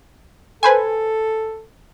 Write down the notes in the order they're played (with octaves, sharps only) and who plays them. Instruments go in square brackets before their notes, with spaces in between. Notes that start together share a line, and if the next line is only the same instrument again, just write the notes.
[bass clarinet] A4 [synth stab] B4 C5 G#5